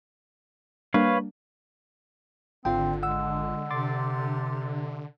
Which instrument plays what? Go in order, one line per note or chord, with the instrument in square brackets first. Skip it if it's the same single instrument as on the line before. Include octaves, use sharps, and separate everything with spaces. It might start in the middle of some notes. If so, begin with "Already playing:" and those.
[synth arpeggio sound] G3 A#3 D4 [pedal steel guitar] B4 C#5 F5
[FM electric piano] G#1 F4 [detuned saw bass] D3 [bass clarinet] C4 [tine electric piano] G5
[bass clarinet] G#3 [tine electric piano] F#5 E6
[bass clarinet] C3 [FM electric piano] C6 D6 A6